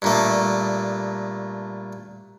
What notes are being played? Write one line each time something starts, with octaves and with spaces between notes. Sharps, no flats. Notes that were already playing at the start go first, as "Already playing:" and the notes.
G2 A#2 A3